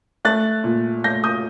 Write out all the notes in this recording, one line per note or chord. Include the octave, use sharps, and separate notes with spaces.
A3 F#6 A6
A#2
A3 G6 A#6
D#6 G6